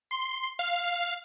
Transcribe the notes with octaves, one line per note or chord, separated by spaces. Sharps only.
C6
F5